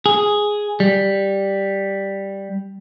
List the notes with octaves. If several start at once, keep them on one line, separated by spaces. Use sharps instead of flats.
G#4
G3